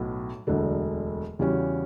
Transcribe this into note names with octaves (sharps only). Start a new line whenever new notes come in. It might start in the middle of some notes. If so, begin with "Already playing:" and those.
Already playing: B1 A2 F#3 B3
E1 D2 D3 F#3
E2 C#3 G3 C#4 F#4